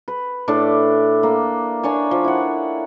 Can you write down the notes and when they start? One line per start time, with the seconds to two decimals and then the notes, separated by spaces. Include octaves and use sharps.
0.08 B4
0.48 A2 D4 A4 D6
1.23 A#3
1.83 A#3 D4 C#5 G#5
2.11 F3
2.24 E4 F#5